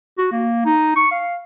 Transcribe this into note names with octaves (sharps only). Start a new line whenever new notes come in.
F#4
A#3
D#4
C#6
F5